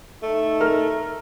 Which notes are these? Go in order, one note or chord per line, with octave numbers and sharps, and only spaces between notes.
A3 D#4
A#4 F6